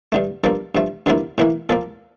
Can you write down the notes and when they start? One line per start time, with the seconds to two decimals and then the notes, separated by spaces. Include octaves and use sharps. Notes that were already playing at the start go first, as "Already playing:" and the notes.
0.12 G2 D3 A3
0.44 G2 F3 A#3 A4
0.75 G2 F3 A3
1.06 G2 D3 F3 A#3 E4
1.38 A2 E3 A#3 E4
1.69 A#2 F3 A#3 A4